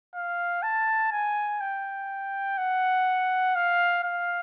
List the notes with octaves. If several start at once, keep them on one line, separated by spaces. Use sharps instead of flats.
F5
A5
G#5
G5
F#5
F5
F5